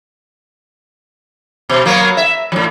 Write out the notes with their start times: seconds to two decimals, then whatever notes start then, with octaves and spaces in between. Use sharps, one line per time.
1.69 B2
1.85 F#3 A#3 B3
2.17 E5
2.52 A2 F3